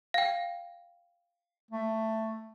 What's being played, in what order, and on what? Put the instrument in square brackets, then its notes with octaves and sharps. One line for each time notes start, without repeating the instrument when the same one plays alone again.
[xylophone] F5 G5
[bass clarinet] A3